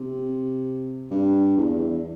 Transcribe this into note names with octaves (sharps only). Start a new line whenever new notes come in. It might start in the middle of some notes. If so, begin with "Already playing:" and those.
Already playing: C3
G2
E2